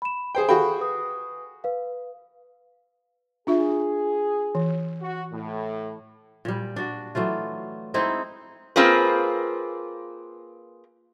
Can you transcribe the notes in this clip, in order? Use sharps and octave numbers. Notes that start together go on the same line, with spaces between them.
B5 E7
G#4 C5 G5
F#4 G#4 A4 F5 G5 B5
B4 D#6
B4 F5
D4 F4 G#4 E5
E3
F#4
A2
A#2 G3
D4 F#4
E3 F#3 A3 F4
G#3 C4 D#4 E4
A#3 C4 F4 G#4 B4